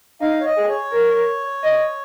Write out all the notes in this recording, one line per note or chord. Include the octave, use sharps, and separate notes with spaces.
D#4 F5
C#5
D#5
G#4
C#5
A#4
D#5